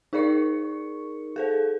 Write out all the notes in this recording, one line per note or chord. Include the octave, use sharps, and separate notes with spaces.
D#4 G#4 A#4 D5 C#6 C#7
G#4 A4 C5